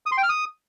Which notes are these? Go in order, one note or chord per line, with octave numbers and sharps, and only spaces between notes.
D#6
C6
G5
F6
D#6